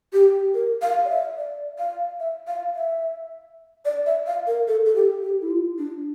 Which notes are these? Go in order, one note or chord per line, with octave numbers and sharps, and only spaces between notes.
G4
A#4
F5
D5
E5
D5
F5
E5
F5
E5
D5
E5
F5
A#4
A4
A4
G4
G4
E4
F4
D4